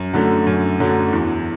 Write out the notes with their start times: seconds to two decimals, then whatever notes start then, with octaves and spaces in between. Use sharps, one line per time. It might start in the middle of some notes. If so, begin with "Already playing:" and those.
Already playing: F#2
0.13 D3 F#3 A3
0.47 F#2
0.80 D3 F#3 A3
1.13 E2